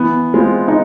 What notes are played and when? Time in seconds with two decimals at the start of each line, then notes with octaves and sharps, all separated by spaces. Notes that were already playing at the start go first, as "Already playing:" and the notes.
Already playing: E3 B3
0.34 G#3 C4 F4
0.68 D#4